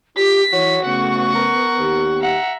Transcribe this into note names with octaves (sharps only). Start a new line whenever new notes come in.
F4 G4 B6
E3 F#4 C#5
C#3 A3 B3 F#5 C#6
A#4
D#2 D#3 G4
E5 F#5 A#5